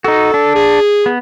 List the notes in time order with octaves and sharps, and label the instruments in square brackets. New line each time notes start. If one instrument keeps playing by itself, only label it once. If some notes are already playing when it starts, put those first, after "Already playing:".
[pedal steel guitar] D#4 F#4 [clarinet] A4
[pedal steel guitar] D4
[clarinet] G#4
[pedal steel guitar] B3